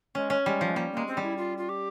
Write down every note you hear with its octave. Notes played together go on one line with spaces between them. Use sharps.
G#3 C#4
C#4
G3 G#3
F3 G#3
G3 A#3
A#3
G#3
C4
G3
E4
F4
F4
G4